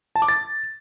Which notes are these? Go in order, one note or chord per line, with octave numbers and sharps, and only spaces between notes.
A5
D6
A6